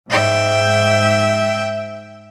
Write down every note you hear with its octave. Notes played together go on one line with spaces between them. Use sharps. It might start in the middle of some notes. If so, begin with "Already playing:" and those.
G#2 E5 G5